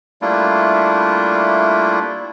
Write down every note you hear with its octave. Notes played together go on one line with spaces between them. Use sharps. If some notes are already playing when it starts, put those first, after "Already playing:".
G3 A3 A#3 D4 E4 F4